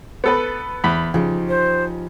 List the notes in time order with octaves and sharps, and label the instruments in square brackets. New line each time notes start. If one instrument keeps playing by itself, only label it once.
[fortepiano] B3 A4 B4
E2 B5
[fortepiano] C#3 [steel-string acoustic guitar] F3 D#4 G4
[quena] C5